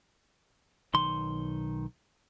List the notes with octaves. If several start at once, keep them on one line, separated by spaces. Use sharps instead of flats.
B1 D#3 C6